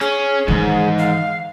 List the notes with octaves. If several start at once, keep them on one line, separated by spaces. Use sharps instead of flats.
C#4 G#4
G#2 D#3 E3
F5